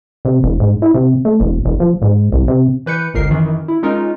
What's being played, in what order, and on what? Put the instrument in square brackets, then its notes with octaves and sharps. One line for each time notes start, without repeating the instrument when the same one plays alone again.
[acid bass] C3
E1
G#2
E4
C3
A3
E1
E1
F3
G#2
C2
C3
[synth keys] E3 B4 G6 C#7
G1 C#2 A#4 C7
F#2 D#3 E3
E4
G#3 C#4 D#4 F4 A#4